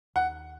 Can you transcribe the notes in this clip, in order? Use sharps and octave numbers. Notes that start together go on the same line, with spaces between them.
D#2 F#5